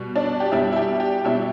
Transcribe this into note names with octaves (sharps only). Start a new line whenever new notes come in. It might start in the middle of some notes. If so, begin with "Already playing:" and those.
Already playing: B2 G3
D4
G4
B2 G3 D4 E4
E4
G4
G4
B2 G3 D4 E4